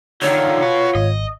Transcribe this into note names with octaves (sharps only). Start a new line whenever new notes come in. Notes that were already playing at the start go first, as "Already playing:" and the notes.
D3 D#3 F4 C#5
F#4 B4
G#1 D#5